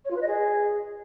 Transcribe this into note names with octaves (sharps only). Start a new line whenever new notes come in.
C#5
F4
B4
D#5
G#4